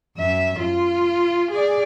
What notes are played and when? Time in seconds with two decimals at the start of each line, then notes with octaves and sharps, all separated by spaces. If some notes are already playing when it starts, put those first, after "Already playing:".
0.17 F#2 E5
0.59 F4
1.51 G#4 D5